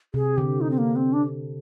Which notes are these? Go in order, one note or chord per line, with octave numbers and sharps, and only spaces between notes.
C3 G#4
D3 G4
D#4
C4
A#3
C4
D4